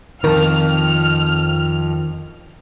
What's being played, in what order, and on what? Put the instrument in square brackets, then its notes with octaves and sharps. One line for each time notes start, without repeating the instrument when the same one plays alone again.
[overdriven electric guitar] C2 F2 [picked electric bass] D#3 [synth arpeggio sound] A#4 A5 [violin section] F6